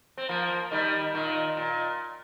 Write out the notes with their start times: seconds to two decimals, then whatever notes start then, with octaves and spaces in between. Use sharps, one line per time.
0.17 C4
0.29 F3 A#3
0.71 D#3 G3
1.14 A#2 D#3
1.57 A#2